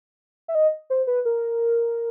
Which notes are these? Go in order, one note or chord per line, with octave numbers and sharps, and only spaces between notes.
E5
D#5
C5
B4
A#4